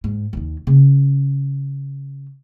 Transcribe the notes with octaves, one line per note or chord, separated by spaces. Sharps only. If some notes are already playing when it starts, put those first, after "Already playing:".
G#2
D#2 D#3
C#3 C#4